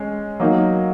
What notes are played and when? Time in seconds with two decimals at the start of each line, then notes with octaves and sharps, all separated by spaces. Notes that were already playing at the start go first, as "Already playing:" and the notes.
Already playing: G#3 C#4
0.40 F#3 A#3 D#4